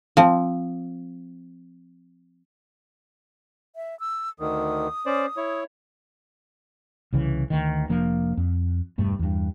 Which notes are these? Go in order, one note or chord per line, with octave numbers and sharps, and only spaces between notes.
F3 C4
E5
E6
D2 D#3 D#6
C#4 C5 D5
E4 C#5
C2 C#3 E3
D2 D#3
F1 F3 A#3 D4
F2
E1 G2 A3
E2 G2